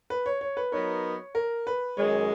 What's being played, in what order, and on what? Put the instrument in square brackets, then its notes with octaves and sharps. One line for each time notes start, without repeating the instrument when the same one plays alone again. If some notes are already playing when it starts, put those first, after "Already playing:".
[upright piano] B4
C#5
C#5
B4
[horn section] F#3 B3 D#4 A#4 [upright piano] C#5
[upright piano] A#4
B4
[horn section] F#2 D#3 G#3 [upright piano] C#5